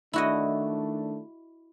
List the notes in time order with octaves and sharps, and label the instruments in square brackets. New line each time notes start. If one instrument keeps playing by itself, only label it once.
[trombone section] D#3 A3 D4 [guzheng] E4 F#4 D#5